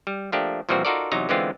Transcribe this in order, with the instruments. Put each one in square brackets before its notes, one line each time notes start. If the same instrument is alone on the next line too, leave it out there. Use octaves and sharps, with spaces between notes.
[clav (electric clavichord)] G3
F3 A3 A#3 D4 G4
A#2 E3 F3 G3 C4 F#4
D#4 F4 F#4 A4 A#4 D5
E2 C3 F#3 D#4 A#5
D3 E3 G#3 B3 C4 F4